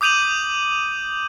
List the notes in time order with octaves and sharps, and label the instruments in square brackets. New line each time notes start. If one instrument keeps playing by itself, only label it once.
[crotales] D6 D#6 G6 D#7 F7 F#7